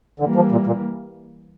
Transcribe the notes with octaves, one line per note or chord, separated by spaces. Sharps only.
D3 E3 G3 A#3
F3
A#2
A#2